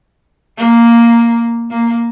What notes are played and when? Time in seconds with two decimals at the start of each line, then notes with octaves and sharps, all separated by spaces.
0.57 A#3
1.71 A#3